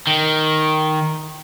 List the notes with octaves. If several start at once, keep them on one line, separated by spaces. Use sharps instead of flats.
D#3